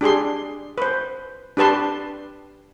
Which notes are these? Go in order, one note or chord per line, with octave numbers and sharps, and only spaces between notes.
D4 G4 G#4 C6
B4 C5
D4 G4 B4 A5 C6